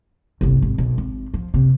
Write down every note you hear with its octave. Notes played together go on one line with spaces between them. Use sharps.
G1 C2
G#1
B1
G#1
F3
F#1 C3